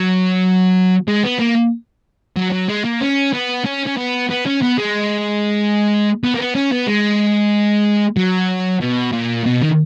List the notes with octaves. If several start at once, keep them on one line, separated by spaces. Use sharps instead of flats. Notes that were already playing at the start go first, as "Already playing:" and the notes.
Already playing: F#3
G#3
B3
A#3
F#3
F#3
G#3
A#3
C#4
B3
C#4
C#4
B3
B3
C#4
B3
G#3
B3
A#3
B3
C#4
B3
G#3
F#3
B2
A#2
B2
D#3